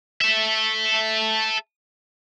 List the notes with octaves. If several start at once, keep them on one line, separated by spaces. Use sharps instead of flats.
A4 E5